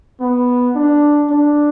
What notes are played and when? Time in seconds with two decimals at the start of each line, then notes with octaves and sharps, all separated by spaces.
0.21 B3
0.75 D4
1.30 D4